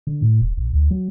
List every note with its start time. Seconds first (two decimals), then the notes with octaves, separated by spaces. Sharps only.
0.07 D3
0.22 A2
0.42 F1
0.57 A#1
0.73 D2
0.91 F#3